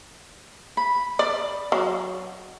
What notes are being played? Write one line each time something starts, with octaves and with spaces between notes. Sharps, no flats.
B5
D5
F#3